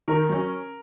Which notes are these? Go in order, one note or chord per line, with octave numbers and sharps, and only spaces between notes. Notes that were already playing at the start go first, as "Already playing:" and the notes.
D#3 A#4
F#3 C#4